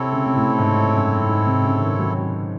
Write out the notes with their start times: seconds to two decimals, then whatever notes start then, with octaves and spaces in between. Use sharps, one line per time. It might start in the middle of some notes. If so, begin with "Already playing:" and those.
Already playing: C3 C4 E4 A4 C#5
0.13 C#3
0.26 C3
0.36 A2
0.59 G#2
0.95 F#2
1.29 G#2
1.47 C3
1.65 C#3
1.82 D#3
1.99 F#3